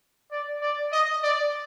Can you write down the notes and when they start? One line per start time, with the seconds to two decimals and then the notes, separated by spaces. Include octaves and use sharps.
0.31 D5
0.61 D5
0.92 D#5
1.23 D5